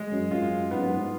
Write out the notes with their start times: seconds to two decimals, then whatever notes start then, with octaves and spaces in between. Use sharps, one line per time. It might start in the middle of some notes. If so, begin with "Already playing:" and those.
Already playing: G#3
0.11 F#2
0.31 F#2 F4
0.71 G#2 B3
0.80 F#2
0.90 G#2